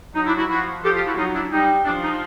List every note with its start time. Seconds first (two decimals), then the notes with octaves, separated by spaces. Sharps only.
0.14 F#3 D#4
0.25 D4 E4
0.36 E4 F#4
0.48 F3 E4 F#4
0.82 F3 G4 A4
0.94 F4 G4
1.06 E4 F#4
1.17 F#3 D#4 F4
1.34 D4 E4
1.51 G3 D#4
1.85 F3 D4
2.03 D#4